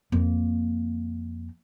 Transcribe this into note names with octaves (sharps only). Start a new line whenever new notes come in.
F2 A#3